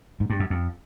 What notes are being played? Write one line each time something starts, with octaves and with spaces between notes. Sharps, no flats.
G#2
G2
F#2
F2